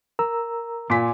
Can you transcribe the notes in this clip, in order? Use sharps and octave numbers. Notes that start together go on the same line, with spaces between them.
A#4 A#5 E6
A#2 G#5 C6 D6 B6